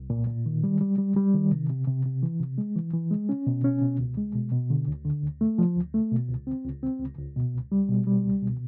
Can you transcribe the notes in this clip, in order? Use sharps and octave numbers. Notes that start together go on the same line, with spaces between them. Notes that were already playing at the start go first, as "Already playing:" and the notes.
Already playing: C2
A#2
A#2
D#3
G3
G3
G3
G3
D#3
C3
C3
C3
C3
E3
C3
G#3
E3
E3
G#3
C#4
B2
C#4
B2
C#2
G#3
B2
B2
D3
D2
D3
D2
A3
F3
D2
A3
B2
C#2
C4
C#2
C4
C#2
C#2
B2
C#2
G3
B2
G3
C#2
B2